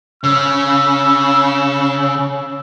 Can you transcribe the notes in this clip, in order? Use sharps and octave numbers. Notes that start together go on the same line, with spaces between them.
C#3 E6